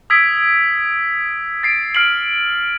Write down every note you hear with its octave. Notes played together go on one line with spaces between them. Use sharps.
D#6 E6 G#6 B6 D7
A6 C7 D7
F6 C7 D7 F#7